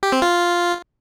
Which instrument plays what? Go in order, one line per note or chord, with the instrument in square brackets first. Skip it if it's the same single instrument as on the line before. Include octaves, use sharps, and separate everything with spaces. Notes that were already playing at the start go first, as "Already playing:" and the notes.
[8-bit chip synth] G4
C4
F4